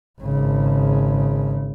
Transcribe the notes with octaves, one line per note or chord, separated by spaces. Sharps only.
G#1 C#3